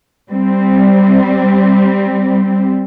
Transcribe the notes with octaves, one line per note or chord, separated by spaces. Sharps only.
G3 C4